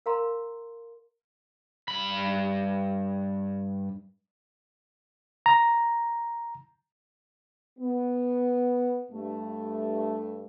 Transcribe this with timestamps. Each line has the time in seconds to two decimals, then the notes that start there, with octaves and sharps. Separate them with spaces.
0.06 A#4 F5 A#5 C6
1.88 G2 B5
5.46 A#5
7.79 B3
9.11 G2 A3